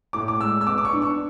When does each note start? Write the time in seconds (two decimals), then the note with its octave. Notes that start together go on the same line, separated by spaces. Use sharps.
0.13 A2 D6
0.28 D6
0.40 G#3 E6
0.61 E6
0.67 B3 D6
0.78 D6
0.85 C#6
0.93 D4
1.02 C#6